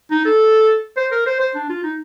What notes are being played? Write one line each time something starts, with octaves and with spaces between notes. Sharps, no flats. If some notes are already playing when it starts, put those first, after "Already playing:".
D#4
A4
C5
A#4
C5
C5
D4
F4
D#4